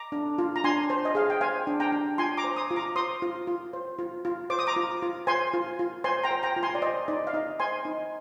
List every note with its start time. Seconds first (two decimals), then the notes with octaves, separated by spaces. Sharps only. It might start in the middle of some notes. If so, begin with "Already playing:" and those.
Already playing: A#5 D6
0.12 D4
0.38 F4
0.56 A#5
0.64 D4 G#5 C6
0.90 C5
1.05 D#5
1.15 G#4 F5
1.30 G5
1.41 C5 F5 G#5
1.67 D4
1.80 G5 A#5
1.92 D4
2.18 F4 G#5 C6
2.38 A#5 D6
2.44 C5
2.57 C6 D#6
2.71 F4
2.76 A#5 D6
2.95 C5 C6 D#6
3.22 F4
3.47 F4
3.73 C5
3.99 F4
4.25 F4
4.50 C5 D6
4.59 D#6
4.67 A#5 D6
4.76 F4
5.02 F4
5.27 C5 G#5 C6
5.54 F4
5.79 F4
6.04 C5 G#5 C6
6.24 G5 A#5
6.31 C5
6.43 G5 A#5
6.56 F4
6.63 G#5 C6
6.75 D5
6.82 C5 D#5
7.08 D#4 D5
7.27 F5
7.33 D#4 D#5
7.60 C5 G#5 C6
7.85 D#4